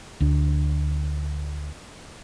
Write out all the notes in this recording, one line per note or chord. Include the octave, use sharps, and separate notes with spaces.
D2 D4